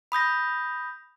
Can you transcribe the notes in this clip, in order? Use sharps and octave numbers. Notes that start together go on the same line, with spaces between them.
B5 D#6 G6 A#6